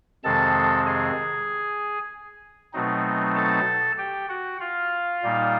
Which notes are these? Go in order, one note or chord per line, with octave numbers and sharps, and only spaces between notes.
F2 C3 D#3 G#3 C4 A4 A5
G#4 G#5
B2 F#3 A3 C4 D#4
A4 A5
G4 G5
F#4 F#5
F4 F5
A#2 G3 A#3 D#4